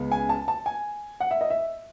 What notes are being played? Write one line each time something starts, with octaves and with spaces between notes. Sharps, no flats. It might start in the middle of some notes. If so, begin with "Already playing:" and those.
Already playing: C#2 C#3 G#3 B3
G#5
A5
A5
G#5
F#5
E5
D#5
E5